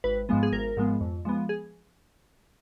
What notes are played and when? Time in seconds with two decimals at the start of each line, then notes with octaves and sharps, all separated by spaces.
0.04 G#1 B4
0.29 G#2 F3 G#3 B3
0.43 G#4
0.52 G#1 A#4
0.77 G#2 F3 G#3 B3
1.01 F2
1.25 F3 G#3 B3
1.49 G#4